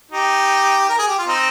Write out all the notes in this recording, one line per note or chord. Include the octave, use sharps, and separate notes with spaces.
D#4 G4
A#4
G#4
G4
F4
C4 D#4